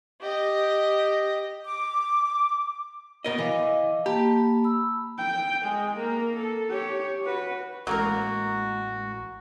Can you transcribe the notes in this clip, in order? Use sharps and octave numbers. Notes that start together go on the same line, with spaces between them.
G4 D#5
D6
B2 A#4 D#5
E3 D#5 F5 D6
A#3 G4 A5 B5
B5 E6
G5
G#3 G#4
A#3 A#4
A4
G4 C#5
F#4 B4
A1 F#3 G#3 A#3 F#4 A#4